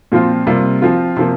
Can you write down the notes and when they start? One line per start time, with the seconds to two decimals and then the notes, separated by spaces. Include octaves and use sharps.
0.12 A#2 F3 C4 F4
0.47 C3 G3 A#3 F4
0.82 F3 C4 F4
1.17 C3 F3 A#3